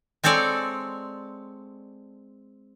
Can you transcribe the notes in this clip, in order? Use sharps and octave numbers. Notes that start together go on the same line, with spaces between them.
G#3 C4 A4 C#5 D5